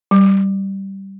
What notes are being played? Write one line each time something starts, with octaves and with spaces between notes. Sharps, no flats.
G3